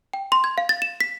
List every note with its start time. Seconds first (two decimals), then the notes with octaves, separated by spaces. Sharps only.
0.14 G5
0.32 C6
0.44 G#6
0.58 F5
0.69 A6
0.82 E7
1.01 B6